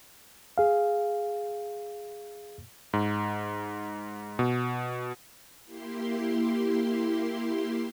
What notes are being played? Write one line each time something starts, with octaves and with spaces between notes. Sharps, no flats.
G#4 F5
G#2
B2
A#3 E4 G4 C6